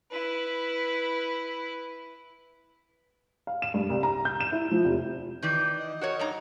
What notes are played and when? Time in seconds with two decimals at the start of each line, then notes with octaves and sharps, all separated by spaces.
0.11 E4 B4
3.47 F5
3.62 E7
3.74 G2
3.90 C2
4.03 A#5
4.25 G6
4.40 E7
4.52 E4
4.71 F3
4.85 F1
5.42 D#3 E3 D5 G6
5.77 D#5
6.01 F#4 A#4 C#5
6.19 G2 D#4 A#5